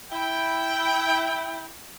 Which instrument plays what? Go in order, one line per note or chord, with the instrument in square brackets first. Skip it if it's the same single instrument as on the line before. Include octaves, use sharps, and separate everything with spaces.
[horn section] E4 G5